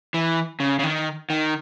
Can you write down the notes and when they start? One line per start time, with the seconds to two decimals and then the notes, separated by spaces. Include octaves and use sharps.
0.14 E3
0.60 C#3
0.79 C#3
0.83 D#3
1.30 D#3